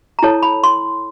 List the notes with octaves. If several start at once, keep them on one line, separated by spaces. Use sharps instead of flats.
A#5
E4 A4 C#5 A5
B5
C6